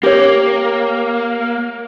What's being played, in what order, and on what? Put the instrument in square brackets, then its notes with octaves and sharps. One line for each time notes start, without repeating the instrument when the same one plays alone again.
[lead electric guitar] A#3 [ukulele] G4 C#5